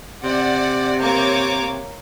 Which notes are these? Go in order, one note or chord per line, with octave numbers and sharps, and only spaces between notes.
C3 D5 F#5
A#3 C#5 D6